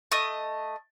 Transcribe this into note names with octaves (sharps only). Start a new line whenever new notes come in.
A3 D#5